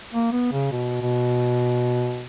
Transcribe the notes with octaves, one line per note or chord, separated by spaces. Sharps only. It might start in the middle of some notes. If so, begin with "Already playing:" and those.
A#3
B3
C#3
B2
B2